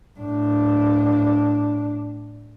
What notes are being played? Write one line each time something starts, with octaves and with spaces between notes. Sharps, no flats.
A2 D4